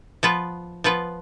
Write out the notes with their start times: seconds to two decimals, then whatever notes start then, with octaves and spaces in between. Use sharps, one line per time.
0.23 F3 B3 F4 B4
0.84 F3 B3 F4 B4